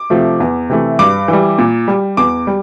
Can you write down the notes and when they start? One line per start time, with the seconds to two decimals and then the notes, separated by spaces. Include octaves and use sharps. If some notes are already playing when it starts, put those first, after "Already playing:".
Already playing: D6
0.10 C3 F3 A3
0.40 E2
0.70 C3 E3 A3
0.99 G2 D6
1.28 E3 G3
1.59 A#2
1.88 G3
2.17 E2 D6
2.47 G3